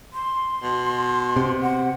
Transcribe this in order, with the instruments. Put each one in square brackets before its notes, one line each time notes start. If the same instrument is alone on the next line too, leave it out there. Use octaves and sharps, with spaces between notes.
[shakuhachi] C6
[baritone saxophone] B2
[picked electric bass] C3
[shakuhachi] F#5